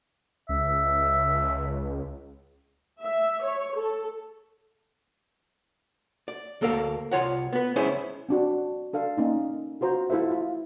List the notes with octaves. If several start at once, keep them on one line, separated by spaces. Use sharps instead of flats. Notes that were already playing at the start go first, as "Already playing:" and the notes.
C#2 E5
E5
C#5
A4
D5
D2 A#3 A4 A#4 F5
C2 F4 C#5 F#5
B3 B4
G#3 C#4 E4 G#4 C5 G#5
C4 D4 F#4
D4 A4 F5
A#3 C#4 D#4
F4 F#4 C5 A#5
E4 F4 A4 C5 E5
F4